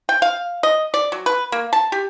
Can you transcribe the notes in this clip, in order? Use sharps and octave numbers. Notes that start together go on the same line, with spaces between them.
G5
F5
D#5
D5
F#3
B4
A#3
A5
G4